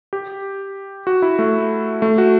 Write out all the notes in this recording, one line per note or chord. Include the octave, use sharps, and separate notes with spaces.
G4
F#4
E4
A3
A3
F#4